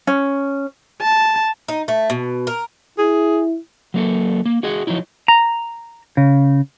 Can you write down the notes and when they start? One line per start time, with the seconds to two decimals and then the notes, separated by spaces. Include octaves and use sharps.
0.07 C#4
1.02 A5
1.68 D#4
1.88 A3
2.10 B2
2.47 A#4
2.98 E4 G#4
3.94 F#3 A#3 A4
4.45 A#3
4.63 F#4 G#4 D#5 F#5
4.87 F3 F#3 D#4 E4
5.28 A#5
6.17 C#3